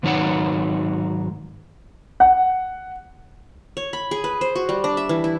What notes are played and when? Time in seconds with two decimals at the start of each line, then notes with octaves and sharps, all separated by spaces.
0.03 G#2 D#3 F#3 D#4 C#5 F#5
2.20 F#5
3.77 C#5
3.93 B5
4.11 G#4
4.24 B4
4.41 C5
4.55 F#4
4.69 G3
4.84 D4
4.97 E5
5.09 E3
5.24 E4